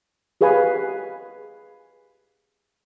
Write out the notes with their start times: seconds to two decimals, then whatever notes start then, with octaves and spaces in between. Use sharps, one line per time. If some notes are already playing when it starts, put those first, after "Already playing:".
0.41 G4 G#4 B4 F5 G#5